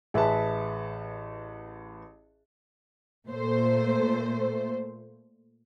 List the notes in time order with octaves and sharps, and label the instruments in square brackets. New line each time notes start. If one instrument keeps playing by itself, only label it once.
[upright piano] A1 B4 A5 [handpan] G#4 E5
[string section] A#2 A3 C5